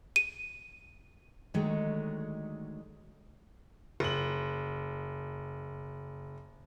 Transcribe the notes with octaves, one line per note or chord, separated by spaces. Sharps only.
D#7
D3 D#3 F#3 G#3 A3
F#1 F#7